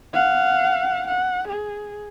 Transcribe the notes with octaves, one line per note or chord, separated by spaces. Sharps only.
F5 F#5
F#5
G#4